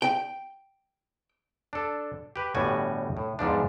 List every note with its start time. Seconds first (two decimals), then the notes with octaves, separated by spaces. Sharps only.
0.02 G5
1.73 D4 A4
2.36 G4 B4
2.55 G1 A2 G3 F#4 G#5
3.17 A2
3.39 E2 G#2 F3 D4